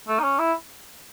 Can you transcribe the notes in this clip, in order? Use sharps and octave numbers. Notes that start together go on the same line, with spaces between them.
A3
D#4
C#4
E4